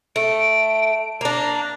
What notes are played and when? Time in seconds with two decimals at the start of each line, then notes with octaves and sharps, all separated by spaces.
0.16 A3 D7
1.21 A#3 D4 A#5